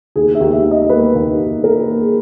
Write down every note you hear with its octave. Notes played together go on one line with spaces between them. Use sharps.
D#2 G#4
E5
D#2
E5
D#2
D#5
A#3 B4
D#2
D#2
A#3 A#4
A#3
G#4